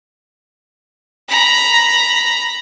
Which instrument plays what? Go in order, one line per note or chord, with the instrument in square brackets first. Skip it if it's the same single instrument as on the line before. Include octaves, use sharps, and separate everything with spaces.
[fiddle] A#5 B5